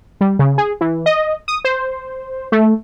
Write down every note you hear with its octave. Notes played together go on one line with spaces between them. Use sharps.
G3
C#3
G#4
E3
D#5
D#6
C5
A3